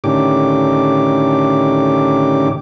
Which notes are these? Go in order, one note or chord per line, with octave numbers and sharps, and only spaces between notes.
A2 D3 D#3 C#4 G4 D6